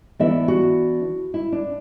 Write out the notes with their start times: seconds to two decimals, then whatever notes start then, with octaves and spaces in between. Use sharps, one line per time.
0.19 E3 B3 D4 E5
0.48 F#4
1.34 E4
1.52 D4